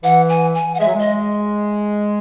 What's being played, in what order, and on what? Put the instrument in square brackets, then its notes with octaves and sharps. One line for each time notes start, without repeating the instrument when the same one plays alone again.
[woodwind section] E3 [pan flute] F#5
[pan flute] G#5
G#5
F#5
[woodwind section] G#3 [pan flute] E5
[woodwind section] F#3
[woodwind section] G#3 [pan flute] D#5